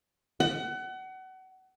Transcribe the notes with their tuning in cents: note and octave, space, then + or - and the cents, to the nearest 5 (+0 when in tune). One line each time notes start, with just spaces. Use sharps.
F#5 +30